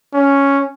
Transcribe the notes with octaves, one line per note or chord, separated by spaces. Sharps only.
C#4